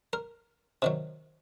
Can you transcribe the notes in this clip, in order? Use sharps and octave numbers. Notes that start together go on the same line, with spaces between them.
A#4
C3 D#3 F#3